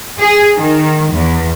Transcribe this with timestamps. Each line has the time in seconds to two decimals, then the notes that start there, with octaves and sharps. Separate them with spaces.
0.20 G#4
0.58 D#3
1.11 E2